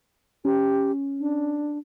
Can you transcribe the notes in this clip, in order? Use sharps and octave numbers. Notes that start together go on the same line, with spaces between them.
C#4 G4
D4